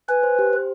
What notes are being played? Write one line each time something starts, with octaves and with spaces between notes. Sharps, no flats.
B4 G#5
C5
G4
C5